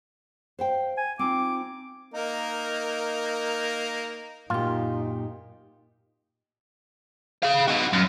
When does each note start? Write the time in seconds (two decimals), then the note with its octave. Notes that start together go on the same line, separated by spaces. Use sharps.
0.59 C5 F5 G5
0.98 G#5
1.19 C4 D#4 F4 D6
2.14 A#3 D#4 A#4
4.50 F#2 A#2 D#4 F4 G4
7.43 G#4 F5
7.68 D#4 F#4
7.93 F#2